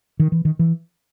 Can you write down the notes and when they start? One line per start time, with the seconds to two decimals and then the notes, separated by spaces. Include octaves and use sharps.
0.19 D#3
0.32 E3
0.45 D#3
0.59 E3